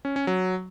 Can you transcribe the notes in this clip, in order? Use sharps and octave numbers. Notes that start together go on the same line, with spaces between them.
C#4
C#4
F#3